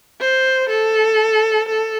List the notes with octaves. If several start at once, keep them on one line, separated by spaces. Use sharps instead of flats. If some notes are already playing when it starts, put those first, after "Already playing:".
C5
A4
A4